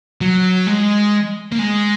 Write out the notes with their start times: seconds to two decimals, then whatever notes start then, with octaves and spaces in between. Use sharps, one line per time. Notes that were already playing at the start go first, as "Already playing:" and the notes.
0.21 F#3
0.67 G#3
1.52 A#3
1.59 G#3